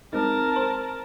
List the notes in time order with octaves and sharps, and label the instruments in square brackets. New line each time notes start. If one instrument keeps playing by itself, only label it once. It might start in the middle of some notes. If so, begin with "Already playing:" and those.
[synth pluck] G#3 C4 D#4 [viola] A#4 A5
[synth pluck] C5